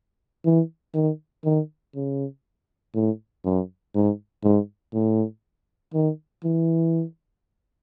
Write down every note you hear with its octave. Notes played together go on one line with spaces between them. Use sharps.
E3
D#3
D#3
C#3
A2
F#2
G#2
G#2
A2
D#3
E3